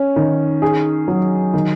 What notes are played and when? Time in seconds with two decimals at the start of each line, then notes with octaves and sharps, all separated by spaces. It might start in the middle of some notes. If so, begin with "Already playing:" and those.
Already playing: C#4
0.16 D#3
0.62 G#4
1.08 F#3
1.54 D#3